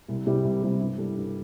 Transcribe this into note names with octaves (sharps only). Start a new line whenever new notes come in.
C2
C3 G3 E4 G4
C2
C3 G3 E4 G4
G2
G3 E4 A4
G2